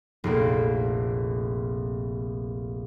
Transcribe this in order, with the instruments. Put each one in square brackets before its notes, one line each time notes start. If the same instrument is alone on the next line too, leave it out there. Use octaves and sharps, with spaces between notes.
[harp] F1 A#1 A#3